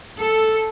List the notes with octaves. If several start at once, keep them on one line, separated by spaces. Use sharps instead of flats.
A4